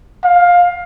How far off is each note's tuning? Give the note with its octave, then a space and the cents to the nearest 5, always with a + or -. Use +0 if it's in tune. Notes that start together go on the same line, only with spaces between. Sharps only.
F5 +15